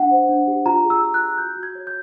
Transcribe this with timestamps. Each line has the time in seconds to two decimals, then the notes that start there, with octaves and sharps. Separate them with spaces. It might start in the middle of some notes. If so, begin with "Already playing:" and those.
Already playing: D4 F#5
0.11 C5
0.29 D4
0.47 G4
0.66 F4 A#5
0.84 G#4
0.90 E6
1.02 F4
1.14 F#6
1.20 F4
1.38 F#4 G6
1.57 F#4
1.63 G#6
1.75 C#5
1.87 G6